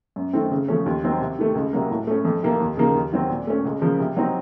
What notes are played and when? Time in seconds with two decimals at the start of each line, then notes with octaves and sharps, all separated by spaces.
0.16 F#2
0.33 D#3 A3 C4
0.51 C#3
0.68 F3 A3 C#4
0.86 D#2
1.04 D#3 F#3 C4 D#4
1.21 C3
1.39 D#3 A3
1.55 C#2
1.73 C3 F#3 A#3
1.90 A2
2.07 A3 C#4
2.25 F2
2.43 C3 D#3 A#3
2.60 D#2
2.77 C#3 F3 A#3 D#4
2.95 D#2
3.13 D#3 F#3 C4
3.30 A#2
3.47 A3 C#4
3.65 C#2
3.82 C#3 F3 A#3
4.00 C3
4.16 F#3 C4 D#4